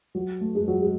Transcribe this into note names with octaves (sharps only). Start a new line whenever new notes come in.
F#3
A3
G#3
F#3
G#3